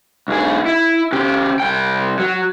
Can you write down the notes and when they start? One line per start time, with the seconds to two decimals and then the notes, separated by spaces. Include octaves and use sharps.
0.28 B1 G#4
0.66 E4
1.12 C#3 G4
1.60 C2 G5
2.19 F#3